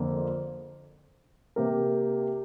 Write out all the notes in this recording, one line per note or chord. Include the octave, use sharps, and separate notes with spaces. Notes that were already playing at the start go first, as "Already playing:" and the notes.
Already playing: F2 D3 A#3
C3 A#3 G4 A#4